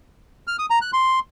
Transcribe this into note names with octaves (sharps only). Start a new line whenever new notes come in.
F6
D#6
A#5
F#6
C6